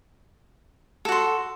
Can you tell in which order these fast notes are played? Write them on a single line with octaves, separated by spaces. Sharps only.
A4 F#4 C6